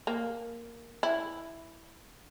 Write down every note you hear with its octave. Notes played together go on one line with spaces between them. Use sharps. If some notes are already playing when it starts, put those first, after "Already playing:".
A#3
E4